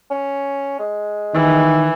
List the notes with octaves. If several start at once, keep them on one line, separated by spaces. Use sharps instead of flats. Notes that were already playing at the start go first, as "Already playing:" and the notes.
C#4
G#3
D#3 E3